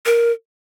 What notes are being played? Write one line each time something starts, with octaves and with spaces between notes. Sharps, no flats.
A#4